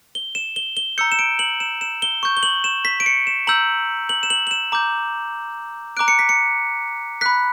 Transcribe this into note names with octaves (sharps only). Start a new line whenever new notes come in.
G7
E7
G7
G7
A#5 E6 G6 C#7
E7
D7
F#7
E7
E7
G7
C#6 G6
G7
F#7
E7
B6
D7
C#7
E7
A#5 E6 G6 F#7
F#7
E7
F#7
F#7
E7
A#5 D6 G6
A#5 D6 F#6 D7
C#7
B6
C#7
B5 F#6 B6